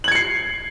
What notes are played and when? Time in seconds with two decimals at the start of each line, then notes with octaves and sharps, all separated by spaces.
0.04 F#7
0.08 G#6
0.12 C#7
0.15 C7